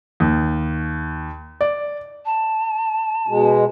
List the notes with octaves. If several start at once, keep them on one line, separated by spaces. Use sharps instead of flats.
D#2
D5
A5
B2 G#3